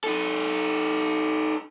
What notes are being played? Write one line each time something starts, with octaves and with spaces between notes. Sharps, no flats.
D#4 A4